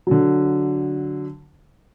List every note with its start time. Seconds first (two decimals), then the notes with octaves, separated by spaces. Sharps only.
0.07 D3 F#3